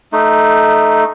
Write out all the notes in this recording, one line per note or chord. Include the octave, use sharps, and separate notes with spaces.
A3 D#4